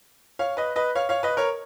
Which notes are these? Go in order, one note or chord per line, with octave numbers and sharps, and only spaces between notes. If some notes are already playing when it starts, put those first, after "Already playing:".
C#5 F5
B4 D#5
B4 D#5
C#5 F5
C#5 F5
B4 D#5
A#4 C#5